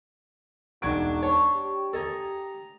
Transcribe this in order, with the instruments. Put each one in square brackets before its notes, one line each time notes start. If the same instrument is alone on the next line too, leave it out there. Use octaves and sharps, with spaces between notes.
[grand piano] E1 G#6 D7 [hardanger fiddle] D4 [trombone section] D#4 [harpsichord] F#4
[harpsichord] C#5 [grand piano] A5
[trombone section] G4
[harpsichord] A4 D#5 G#5 [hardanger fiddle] A#5